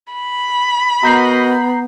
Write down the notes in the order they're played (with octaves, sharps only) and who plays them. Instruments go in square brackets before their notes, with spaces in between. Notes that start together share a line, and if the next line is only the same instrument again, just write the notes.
[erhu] B5
[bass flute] B3 [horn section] F#4 A#4 D#5 [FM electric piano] A#5 G6 C7